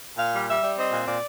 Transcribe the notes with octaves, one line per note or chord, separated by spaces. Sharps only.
A#2 F5
G3
G3 E5
G3
C4 D#5
A#2
A#2 D5